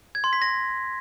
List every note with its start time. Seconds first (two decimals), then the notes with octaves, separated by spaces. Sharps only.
0.15 G#6
0.24 C6
0.33 B6
0.42 A#6